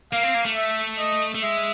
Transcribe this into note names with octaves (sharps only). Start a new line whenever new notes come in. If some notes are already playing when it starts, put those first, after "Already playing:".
A#3 F5
C4
A#3
A3
E5
D#5
A3
G#3 E5